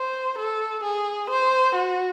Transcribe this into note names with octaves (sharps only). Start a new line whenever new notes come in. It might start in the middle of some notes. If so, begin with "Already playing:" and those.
Already playing: C5
A4
G#4
C5
F#4